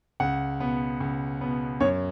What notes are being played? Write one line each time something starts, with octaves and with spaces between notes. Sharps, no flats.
C#2 F#5
B2 B3
C#2
B2 B3
F#2 C#5